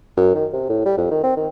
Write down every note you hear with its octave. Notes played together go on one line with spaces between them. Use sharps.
F#2
D#3
C3
A2
G3
F2
D#3
C4
D#3